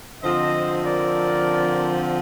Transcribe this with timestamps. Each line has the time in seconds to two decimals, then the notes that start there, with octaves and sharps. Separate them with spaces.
0.23 D3 F3 C4 C5 D#5
0.85 A#4 D5